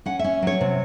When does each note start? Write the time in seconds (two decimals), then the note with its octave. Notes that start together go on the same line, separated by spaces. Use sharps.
0.06 C#4 F#5
0.19 E5
0.24 C#4
0.42 F#3 C#5
0.61 C3